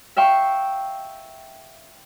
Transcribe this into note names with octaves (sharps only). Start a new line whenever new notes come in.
E5 F5 G5 C#6